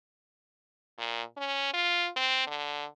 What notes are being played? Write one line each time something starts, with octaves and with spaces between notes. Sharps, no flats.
A#2
C#4
F4
C4
D3